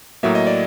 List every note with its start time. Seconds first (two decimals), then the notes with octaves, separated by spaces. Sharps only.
0.23 A2 F#3 A#3 E5
0.35 D#5
0.47 D5